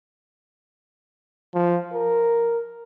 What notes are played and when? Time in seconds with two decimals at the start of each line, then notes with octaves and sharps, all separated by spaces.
1.54 F3
1.93 A#4